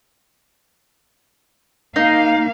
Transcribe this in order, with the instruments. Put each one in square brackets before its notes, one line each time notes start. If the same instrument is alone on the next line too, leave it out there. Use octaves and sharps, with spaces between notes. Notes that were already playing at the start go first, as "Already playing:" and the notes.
[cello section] A#3 F5 [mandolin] D#4